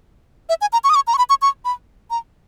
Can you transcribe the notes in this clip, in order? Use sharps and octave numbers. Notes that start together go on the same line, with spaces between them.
E5
G#5
A#5
C#6
D#6
C#6
A#5
C#6
B5
C#6
C#6
B5
A#5